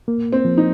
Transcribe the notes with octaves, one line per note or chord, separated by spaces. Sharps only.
A#3
C4
F3
D#4